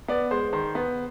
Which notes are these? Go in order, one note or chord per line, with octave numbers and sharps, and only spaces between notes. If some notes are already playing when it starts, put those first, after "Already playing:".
B3 D5
G#3 C5
D#3 C5
B3